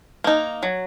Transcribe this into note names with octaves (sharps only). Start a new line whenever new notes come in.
A#3 D#4
F#3